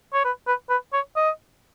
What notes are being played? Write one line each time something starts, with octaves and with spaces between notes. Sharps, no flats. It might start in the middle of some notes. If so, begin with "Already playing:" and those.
C#5
B4
B4
B4
C#5
D#5